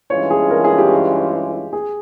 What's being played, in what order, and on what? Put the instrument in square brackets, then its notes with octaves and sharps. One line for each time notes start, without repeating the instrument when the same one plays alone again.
[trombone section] G2 E3 G#3 C#4 F4 [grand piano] C#5
[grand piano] G#4
A#4
G#4
G4
G#4